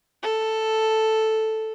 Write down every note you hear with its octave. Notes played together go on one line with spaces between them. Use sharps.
A4